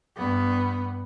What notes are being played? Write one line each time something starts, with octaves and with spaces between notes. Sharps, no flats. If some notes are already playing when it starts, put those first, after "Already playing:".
G2 B3